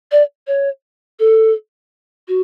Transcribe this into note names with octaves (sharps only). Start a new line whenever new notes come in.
D5
C#5
A4
F#4